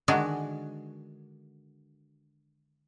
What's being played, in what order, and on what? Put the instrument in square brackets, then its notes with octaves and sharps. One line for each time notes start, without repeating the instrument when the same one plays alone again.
[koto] D3 D#3 G#3 D4 F#4 G#4